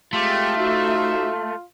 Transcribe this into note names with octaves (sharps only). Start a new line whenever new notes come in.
G#3 A3 C4 F4 G4
D#4 F#4 C5 E5